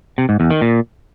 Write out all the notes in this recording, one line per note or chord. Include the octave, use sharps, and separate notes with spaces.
C3
G#2
E2
D#3
A#2